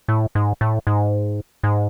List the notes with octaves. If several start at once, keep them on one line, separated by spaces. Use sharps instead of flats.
A2
G#2
A2
G#2
G#2